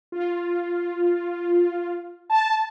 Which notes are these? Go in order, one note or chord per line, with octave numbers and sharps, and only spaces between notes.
F4
A5